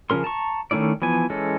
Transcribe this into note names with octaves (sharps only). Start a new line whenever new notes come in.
C#3 F3 C#4 A#4 C6
A5 A#5 C#6
D#3 A3 C#4 E4 D5
E3 F3 B3 G#5
E3 G#3 C#4 A4